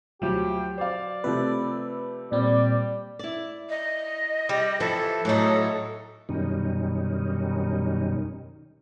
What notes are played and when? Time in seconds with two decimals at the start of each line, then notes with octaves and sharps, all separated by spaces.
0.22 D2 F3 F#3 G4
0.78 C5 D5 F5
1.24 C3 F3 A3 B4
2.32 A#2 G3 C4 D5
3.19 E4 D5
3.70 D#5
4.49 G3
4.80 E3 F3 A4
5.25 A2 E3 F#3 D#4
6.29 F#2 B2 D#3 G3 C#4 D#4